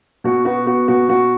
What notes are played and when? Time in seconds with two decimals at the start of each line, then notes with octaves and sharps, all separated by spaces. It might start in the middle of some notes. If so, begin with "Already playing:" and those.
0.24 B2 F#4
0.45 B3 F#4
0.66 B3 F#4
0.88 B2 F#4
1.09 B2 F#4